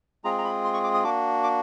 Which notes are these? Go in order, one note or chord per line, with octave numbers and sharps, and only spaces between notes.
G#3 C4 F4 G#4 A#5
A#5
B5
C6
C#6
D6
D#6
A#3 D4 F#4 D6
D6